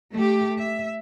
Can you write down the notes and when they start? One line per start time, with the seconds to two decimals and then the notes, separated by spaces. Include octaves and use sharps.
0.14 A3 G4
0.59 E5